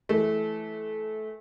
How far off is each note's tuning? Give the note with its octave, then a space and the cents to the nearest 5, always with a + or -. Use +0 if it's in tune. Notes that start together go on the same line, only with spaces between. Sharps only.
E3 +0 A3 -20